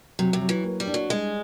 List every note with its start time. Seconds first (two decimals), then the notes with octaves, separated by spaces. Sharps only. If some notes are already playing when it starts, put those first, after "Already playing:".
0.19 C3 F#3
0.33 C3
0.41 F#3
0.49 E3
0.64 A#3
0.80 G3
0.87 D4
0.94 F#3
1.09 G3 G#3